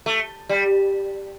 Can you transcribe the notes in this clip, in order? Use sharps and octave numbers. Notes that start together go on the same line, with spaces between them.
A3
G3